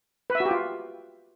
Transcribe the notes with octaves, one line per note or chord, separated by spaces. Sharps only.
B4
E5
F#4
G4
F4